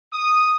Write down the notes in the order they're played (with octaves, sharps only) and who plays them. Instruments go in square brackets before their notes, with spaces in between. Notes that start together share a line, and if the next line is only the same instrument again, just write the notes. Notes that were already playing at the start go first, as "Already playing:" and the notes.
[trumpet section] D#6